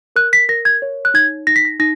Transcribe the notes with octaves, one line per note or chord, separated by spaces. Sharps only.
A#4 F#6
B6
A#4 A#6
G#6
C#5
F#6
D#4 G#6
D#4 A#6
B6
A#6
D#4 A#6